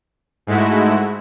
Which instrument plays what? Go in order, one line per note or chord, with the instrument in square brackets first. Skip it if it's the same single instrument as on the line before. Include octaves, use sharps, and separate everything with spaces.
[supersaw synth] G#2 G#3 A3 E4 F#4